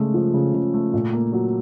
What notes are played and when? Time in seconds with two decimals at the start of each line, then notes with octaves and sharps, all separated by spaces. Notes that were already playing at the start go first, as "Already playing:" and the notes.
Already playing: C#3 G#3 A3
0.14 F3
0.34 C#3
0.54 C#3
0.74 A3
0.94 A#2
1.13 A#3
1.32 F#3